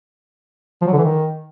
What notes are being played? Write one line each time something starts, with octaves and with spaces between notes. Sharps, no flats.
F3
F#3
D3
E3
D#3